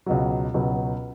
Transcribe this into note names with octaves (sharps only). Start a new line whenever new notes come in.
C#2 B2 F#3
C#2 B2 F#3